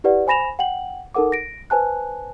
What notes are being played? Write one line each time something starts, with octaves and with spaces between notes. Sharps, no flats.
E4 G4 B4 D5 F#5
C5 G#5 B5 A#6 E7 F7
F#5 G5 F#7
D#4 A4 A#4 F#5 D6
A#6 D7
B4 C5 G#5 A5 F#6